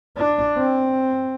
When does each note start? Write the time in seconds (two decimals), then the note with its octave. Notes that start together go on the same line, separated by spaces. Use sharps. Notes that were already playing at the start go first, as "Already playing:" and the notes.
0.17 D4
0.57 C4